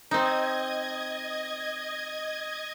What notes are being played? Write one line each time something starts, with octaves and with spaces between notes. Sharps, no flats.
C4 D#4 D#5 G#6